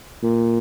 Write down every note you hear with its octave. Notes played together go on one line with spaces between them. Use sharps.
A#2